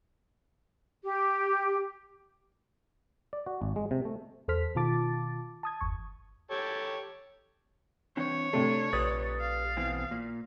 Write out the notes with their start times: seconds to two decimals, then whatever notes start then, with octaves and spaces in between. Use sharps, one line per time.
1.03 G4
3.33 D5
3.46 F#4
3.62 G#1
3.76 G#3
3.91 C3
4.05 A3
4.48 E2 A4 C5 F6 B6
4.75 B2 D#3 F4 A5 D6 A6
5.63 A5 D#6 G#6
5.81 G1 E2 C#6
6.51 G4 A4 C#5
8.17 E3 C4 D4 C#5
8.53 C3 A3 D4
8.93 A#1 G4 B4 D5 D#6 A6
9.40 F5
9.77 B2 E3 C4
10.11 A#2